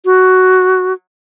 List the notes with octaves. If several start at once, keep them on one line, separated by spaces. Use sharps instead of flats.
F#4